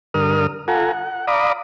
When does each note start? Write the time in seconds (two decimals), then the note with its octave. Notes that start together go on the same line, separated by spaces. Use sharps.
0.14 G2 D3 A#4 D#6 F6
0.68 F4 A4 F#5 G#5 A#5
0.92 F#5
1.27 D5 F5 A#5 B5 D6 D#6